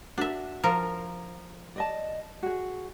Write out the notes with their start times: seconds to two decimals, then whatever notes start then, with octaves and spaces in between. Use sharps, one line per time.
0.18 D4 F#4 E5
0.64 F3 A#4 A#5
1.76 D5 D#5 A5
2.43 F#4 G#4